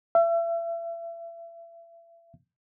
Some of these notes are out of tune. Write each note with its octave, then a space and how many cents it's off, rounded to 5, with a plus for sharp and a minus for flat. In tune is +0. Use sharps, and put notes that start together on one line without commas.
E5 +35